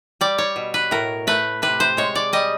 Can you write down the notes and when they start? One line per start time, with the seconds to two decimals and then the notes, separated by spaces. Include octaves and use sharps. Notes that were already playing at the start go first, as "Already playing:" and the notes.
0.21 G3 D5
0.38 C#5
0.56 B2
0.74 B4
0.91 A2 A#4
1.27 A3 B4
1.62 C3 B4
1.80 C5
1.97 G#3 C#5
2.15 D5
2.33 G3 D#5